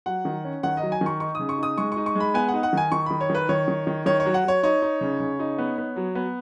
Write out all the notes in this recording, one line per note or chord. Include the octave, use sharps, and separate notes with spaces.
F#3 F#5
D#3
C#4
D#3 F#5
F#3 D#5
G#5
D#3
C#6
D#4 C#6
C#3 D#6
C#6
D#4 D#6
G#3 C#6
D#4 C#6
C#6
G#3 B5
B3 G#5
F#5
D#4
F#5
D#3 G#5
D#3 C#6
D#3 B5
C#5
D#3 B4
D#3 C#5
D#3
D#3
D#3 C#5
C#5
F#3
F#5
F#3 C#5
D#4 C#5
D#4
C#3
C#3
D#4
B3
B3
F#3
B3